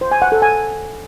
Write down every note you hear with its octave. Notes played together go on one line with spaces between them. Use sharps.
C5
G#5
F#5
A4
G#5